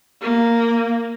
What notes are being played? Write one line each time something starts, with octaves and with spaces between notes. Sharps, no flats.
A#3